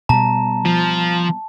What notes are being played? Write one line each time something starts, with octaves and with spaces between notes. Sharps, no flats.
B2 G3 A5 A#5
F3